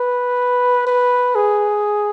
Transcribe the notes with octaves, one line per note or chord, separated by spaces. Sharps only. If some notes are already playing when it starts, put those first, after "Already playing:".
Already playing: B4
B4
G#4